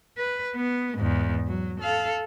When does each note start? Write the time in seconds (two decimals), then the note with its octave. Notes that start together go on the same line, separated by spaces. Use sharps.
0.17 B4
0.56 B3
0.98 E2 G#2
1.47 F#3
1.80 A4 F5